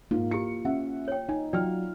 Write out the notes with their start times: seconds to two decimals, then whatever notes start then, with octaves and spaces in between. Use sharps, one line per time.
0.11 G#2 A#3 F4
0.31 E4 G4 C#7
0.65 C#4 E5 F#5
1.08 C#5 G5
1.29 D#4 G#5
1.53 F#3 F4 D5 G5 F6